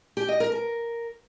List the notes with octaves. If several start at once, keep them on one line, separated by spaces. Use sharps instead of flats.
G4
D#5
A#4
A#4